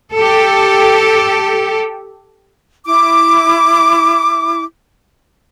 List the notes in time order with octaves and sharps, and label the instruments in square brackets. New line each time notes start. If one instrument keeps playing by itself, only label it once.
[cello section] G4 A4
[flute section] E4 D6